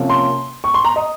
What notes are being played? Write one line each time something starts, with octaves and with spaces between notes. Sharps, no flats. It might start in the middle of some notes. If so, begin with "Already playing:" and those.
Already playing: C3 F3 A#3 C#4
C6
C#6
C6
A#5
D#5